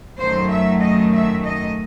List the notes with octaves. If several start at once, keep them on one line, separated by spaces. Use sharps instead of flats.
F#2 D#3 F#3 A3 C5
E5
D#5
E5
D#5